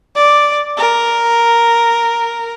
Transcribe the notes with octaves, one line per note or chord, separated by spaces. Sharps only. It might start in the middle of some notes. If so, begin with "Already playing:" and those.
D5
A#4